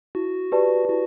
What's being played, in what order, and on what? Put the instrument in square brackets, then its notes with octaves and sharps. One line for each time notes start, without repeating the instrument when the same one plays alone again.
[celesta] E4 [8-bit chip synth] F#4
[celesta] G4 B4 D5 A5
[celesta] E4 [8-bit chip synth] F#4